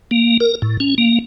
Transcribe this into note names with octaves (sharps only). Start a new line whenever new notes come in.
A#3
A#4
A2
C#4
A#3